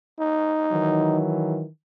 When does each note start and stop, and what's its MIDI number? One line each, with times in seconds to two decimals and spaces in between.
0.19 1.18 63
0.70 1.64 51
0.70 1.64 52
0.70 1.64 54